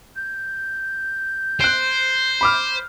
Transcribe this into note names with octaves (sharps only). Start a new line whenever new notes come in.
G6
C5 F#6 D7
B5 D6 F6